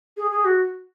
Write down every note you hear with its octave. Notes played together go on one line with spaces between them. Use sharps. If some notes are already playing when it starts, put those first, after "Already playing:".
G#4
G#4
F#4